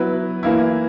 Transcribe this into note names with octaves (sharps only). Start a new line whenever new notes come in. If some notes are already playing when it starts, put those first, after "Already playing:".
Already playing: F#3 B3 E4 B4
E3 A#3 E4